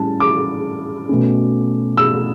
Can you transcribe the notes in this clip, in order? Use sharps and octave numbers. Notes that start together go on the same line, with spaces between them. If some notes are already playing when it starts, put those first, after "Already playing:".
Already playing: A2 G3 C#4 A5
D6
B2 A3 C#4
E6